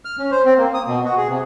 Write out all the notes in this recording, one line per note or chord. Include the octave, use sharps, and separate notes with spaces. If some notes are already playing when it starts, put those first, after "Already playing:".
F6
C#4
C5
C4
A#3
D#6
B2
F#4
G#4
C3